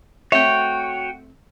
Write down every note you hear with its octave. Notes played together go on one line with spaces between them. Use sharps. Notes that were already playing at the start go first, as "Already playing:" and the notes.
A3 C4 F#4 C#5 E5 G5